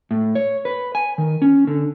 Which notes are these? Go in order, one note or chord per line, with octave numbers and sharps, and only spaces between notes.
A2
C#5
B4
G#5
D#3
C#4
D3